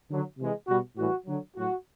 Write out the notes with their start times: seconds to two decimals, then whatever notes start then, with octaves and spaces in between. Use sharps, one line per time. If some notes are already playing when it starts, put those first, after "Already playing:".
0.09 D3 F#3
0.38 C3 E3 G#3
0.68 B2 G3 F#4
0.97 A2 E3 G3 F#4
1.26 D3 F#3
1.56 A2 F#3 F#4